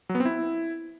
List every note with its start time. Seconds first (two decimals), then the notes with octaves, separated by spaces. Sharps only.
0.09 F#3
0.15 B3
0.20 C4
0.25 E4